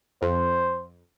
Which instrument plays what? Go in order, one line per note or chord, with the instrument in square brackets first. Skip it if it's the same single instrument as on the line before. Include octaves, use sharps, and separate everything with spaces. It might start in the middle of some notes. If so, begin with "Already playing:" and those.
[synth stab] F2 [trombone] C5